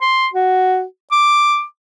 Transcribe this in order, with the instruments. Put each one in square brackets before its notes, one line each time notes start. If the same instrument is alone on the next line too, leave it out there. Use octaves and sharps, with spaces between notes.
[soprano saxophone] C6
F#4
D6